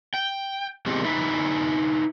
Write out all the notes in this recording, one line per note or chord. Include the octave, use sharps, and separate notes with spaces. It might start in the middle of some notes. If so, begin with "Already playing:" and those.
G5
E2 G#3 C4 G4 D#5
D4 D#4 B4 E5